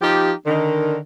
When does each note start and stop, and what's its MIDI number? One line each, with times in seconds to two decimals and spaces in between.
0.02 0.32 53
0.02 0.32 63
0.02 0.32 67
0.47 0.96 50
0.47 0.96 51